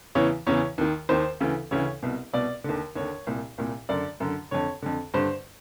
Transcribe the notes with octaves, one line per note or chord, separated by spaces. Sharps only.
E2 C#3 E3 C#5
E2 C#3 E3 C#5
D#2 D#3
D#2 D#3 C5
D2 C#3 E3
D2 C#3 E3 C#5
C2 B2
C2 B2 D5
D#2 D3
D#2 D3 C#5
C2 A#2
C2 A#2
F#2 D3 D5
F#2 D3
F2 D3 C#5
F2 D3
G2 D3 C5